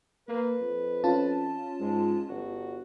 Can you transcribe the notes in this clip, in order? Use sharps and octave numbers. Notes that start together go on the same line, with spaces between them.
A#3 B4
F2
C#4 F4 A5
G#2 G#3
G1 F#4